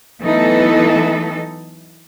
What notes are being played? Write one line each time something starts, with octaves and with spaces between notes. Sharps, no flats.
E3 F#3 A3 B3 D#4 A4